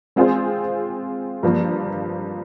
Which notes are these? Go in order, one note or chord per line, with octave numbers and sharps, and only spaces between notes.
G#3 C4 F4 G#4 C5
G2 F3 A#3